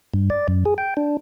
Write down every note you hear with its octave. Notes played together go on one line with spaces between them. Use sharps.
G2
D5
F#2
G#4
G5
D4